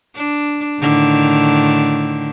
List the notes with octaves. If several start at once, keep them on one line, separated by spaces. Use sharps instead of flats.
D4
A2 D3 D#3